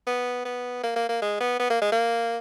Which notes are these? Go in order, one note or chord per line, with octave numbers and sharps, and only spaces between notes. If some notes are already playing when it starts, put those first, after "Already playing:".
B3
B3
A#3
A#3
A#3
G#3
B3
B3
A#3
G#3
A#3